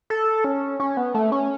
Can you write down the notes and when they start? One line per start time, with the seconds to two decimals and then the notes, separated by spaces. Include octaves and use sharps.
0.10 A4
0.44 C#4
0.80 C#4
0.97 B3
1.14 A3
1.32 C#4